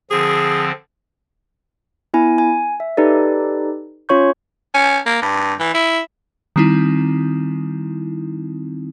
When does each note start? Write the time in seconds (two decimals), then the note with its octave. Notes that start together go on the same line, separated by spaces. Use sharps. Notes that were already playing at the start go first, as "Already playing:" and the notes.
0.11 D3 F3 C4 G#4
2.14 B3 E4 G#5
2.38 G#5
2.80 E5
2.97 D#4 G4 A4 B4 D5
4.09 C#4 F4 C#5 C#6 G6
4.74 C#4
5.06 A#3
5.22 G2
5.60 E3
5.74 E4
6.56 D#3 G3 C4 D#4 E4